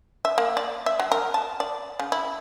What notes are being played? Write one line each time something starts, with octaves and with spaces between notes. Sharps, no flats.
E5
A#3
D5
E5
F#3
A#4
A5
D5
C#3
E4